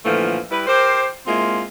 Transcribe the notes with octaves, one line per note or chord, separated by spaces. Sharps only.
A#2 D3 E3 F3 A3
G3 E4 B4
G4 A#4 C5
G#3 A#3 C4 E4 F4